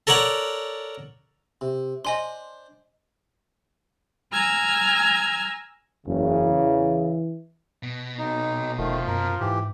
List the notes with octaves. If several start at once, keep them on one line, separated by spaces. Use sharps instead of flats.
A4 A#4 C#5 D5 F#5
C3
D4 C5 D#5 G#5 C6
G#5 A#5 E6 F6 G#6
F#1 E2 C#3
E3
B2
B1 D#4
F1 D#3 F3 A3
F#2 A#4
G#2 E3 G4